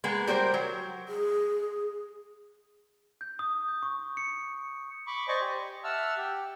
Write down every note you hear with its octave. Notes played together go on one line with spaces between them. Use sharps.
G#3 A#3 B3
G3 G4 A#4 C5
F#3
G#4
G6
D#6
G6
C#6
C#7
B5 C#6 D6
C5 D5 D#5 G#5 C#6 D6
G4
E5 F#5 A5 E6 F6
G4